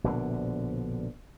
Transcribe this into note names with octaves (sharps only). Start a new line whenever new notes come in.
A#1 B2 D3